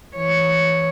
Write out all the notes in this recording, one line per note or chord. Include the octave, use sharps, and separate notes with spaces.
E3 C#5